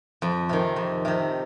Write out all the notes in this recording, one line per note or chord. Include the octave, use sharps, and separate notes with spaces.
F2
C3 D#3
F2
C3 D#3